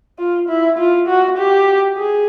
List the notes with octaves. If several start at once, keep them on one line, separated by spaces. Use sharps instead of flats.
F4
E4
F4
F#4
G4
G#4